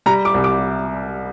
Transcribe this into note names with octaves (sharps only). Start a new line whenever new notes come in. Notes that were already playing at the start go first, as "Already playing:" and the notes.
G3 A#5
D6
C2
D6